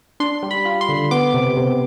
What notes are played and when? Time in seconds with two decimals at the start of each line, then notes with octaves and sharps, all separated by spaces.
0.20 D4 C6
0.43 G3
0.51 B5
0.65 F4
0.81 C6
0.89 D3
1.11 B3 D6
1.34 C3
1.57 C3